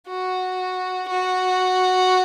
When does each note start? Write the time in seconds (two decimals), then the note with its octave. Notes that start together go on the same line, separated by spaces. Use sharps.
0.08 F#4
1.10 F#4